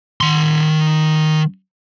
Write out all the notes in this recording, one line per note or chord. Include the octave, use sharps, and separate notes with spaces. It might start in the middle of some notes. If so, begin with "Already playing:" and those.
D#3 C6